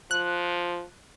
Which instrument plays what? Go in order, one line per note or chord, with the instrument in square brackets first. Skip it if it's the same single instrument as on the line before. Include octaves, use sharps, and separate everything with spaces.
[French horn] F3 [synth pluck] F#6